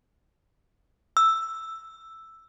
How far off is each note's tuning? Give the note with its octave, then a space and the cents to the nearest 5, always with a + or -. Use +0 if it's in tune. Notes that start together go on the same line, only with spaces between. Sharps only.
E6 +0